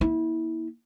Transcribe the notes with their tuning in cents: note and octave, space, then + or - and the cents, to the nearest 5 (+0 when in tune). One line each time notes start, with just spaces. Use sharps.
A#3 +35 E4 -25